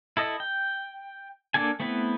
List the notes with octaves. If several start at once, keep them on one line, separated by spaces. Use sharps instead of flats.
E4 A4 D#5
G5
A#3 D4 A4 G#5
A3 B3 C4 E4 B4